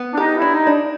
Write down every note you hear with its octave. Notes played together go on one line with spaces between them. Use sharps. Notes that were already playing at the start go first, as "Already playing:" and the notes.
Already playing: B3
D4
D#4 G4
E4
D4
D#4
D4